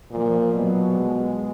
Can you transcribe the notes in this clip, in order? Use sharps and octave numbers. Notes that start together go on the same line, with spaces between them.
A#2 F3
B2 F#3
G#3